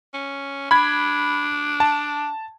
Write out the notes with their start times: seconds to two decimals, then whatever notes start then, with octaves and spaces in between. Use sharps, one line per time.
0.14 C#4
0.71 D4 B5 G#6
1.80 A5